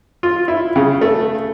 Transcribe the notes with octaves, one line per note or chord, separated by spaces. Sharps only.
F4
E4
C#3
A3